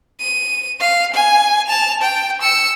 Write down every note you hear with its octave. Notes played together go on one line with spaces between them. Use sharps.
D#7
F5
G#5
A5 F7
G5
E6 C#7